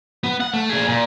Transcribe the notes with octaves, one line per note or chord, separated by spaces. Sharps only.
B3
F#5
A3
A#2 G#4
A#2